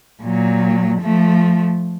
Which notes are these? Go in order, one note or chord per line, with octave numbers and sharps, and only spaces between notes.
A#2 F#3
F3 A3